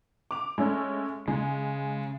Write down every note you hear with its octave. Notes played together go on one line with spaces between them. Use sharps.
D6 F7
G#3 A3 C#4
C#3 G#3